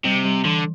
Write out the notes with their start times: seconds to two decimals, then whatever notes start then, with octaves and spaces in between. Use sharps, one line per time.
0.05 C3 G3
0.24 G3
0.44 D3 E3